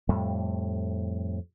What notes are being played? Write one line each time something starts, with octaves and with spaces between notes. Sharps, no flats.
F2 A2 G3